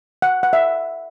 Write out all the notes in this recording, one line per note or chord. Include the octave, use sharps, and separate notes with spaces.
F#5
F#5
E5